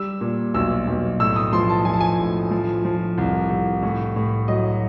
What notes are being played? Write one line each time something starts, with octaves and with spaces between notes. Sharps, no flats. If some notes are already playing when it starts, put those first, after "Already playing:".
Already playing: G3 E6
A#2
B1 E6
B1
A2 E6
D#6
F3 C6
A5
F3 G#5
A5
G#5
A2
F3
F3
C2
C2
A2
A2
F#3 D#5